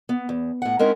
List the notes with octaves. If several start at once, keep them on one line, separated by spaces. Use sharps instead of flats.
B3
E2
A2 F#5
G#3 C4 C#4 D#4 E4 A#4